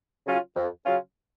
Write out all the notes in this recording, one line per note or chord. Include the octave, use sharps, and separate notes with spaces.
C#3 F#3 C#4 F4
F2
C#3 F#3 C#4 F4